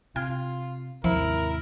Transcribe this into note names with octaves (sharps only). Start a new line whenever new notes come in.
C3 F4 G5 F6 G#6
D#2 G#2 C3 F3 E4 A#4